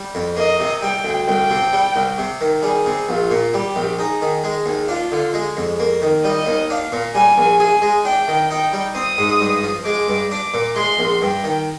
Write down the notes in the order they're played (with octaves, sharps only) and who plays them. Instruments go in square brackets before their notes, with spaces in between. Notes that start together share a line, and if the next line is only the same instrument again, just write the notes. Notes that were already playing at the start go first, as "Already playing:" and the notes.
Already playing: [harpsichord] G3
F2
[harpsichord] A#3 [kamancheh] D#5
[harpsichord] C3
[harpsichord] G3 [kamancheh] G5
[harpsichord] D2
[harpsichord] C2 [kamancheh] G5
[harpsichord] C3
G3
C2
C3
D#3
[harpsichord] G3 [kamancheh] G#4
[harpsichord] C3
[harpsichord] A#1 [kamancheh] F4
[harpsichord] A#2
[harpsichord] G3 [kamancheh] G4
[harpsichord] A#1
[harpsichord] D#4 [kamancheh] G#4
[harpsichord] D#3
G#3
D#2
[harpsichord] D4 [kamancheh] F4
[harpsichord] D3
G#3
F2
A#3
D#3
[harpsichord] G3 [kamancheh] D#5
[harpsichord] D#2
[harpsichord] D4 [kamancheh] F5
[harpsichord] A#2
[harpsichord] G3 [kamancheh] G#5
[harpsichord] A#1
[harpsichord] G#4 [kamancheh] G#5
[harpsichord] G#3
[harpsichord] D4 [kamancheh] G5
[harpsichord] D#3
[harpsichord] D#4 [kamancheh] G5
[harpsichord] G3
[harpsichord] C4 [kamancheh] D#6
[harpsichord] G#2
G2
F3
[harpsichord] G#3 [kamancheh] D6
[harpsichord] G2
[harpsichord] D4 [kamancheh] D6
[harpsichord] A#2
[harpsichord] G#3 [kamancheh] C6
[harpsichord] A#1
[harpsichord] G2 [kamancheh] G5
[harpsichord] D#3